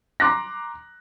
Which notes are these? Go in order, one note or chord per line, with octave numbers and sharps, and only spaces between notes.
A#5 C6 D6 F#6 A#6